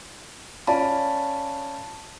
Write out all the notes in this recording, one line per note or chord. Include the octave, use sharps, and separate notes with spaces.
C#4 F4 D5 A5 B5